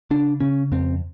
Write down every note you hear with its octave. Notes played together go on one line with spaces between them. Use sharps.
C#3 D4
C#3 C#4
F2 C4